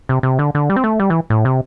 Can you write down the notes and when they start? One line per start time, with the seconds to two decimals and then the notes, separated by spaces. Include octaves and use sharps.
0.09 C3
0.23 C3
0.39 D3
0.55 D3
0.70 G3
0.76 C4
0.84 A3
1.00 G3
1.10 E3
1.30 A2
1.45 C3